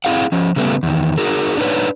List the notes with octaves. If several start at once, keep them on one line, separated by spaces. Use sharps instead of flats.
C4 E4 G#4 F5 F#5
F3 C#4
C#3 G3 A3 B3
E2 D#3
D#4 F#4 G#4 A#4
D4 D#4 G#4 B4 C#5